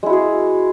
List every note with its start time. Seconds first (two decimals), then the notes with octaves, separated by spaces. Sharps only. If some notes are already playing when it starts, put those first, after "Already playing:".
0.03 G#3
0.06 E4
0.10 F#4
0.13 G#4